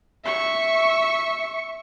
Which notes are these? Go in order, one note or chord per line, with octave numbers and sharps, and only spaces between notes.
E5 C#6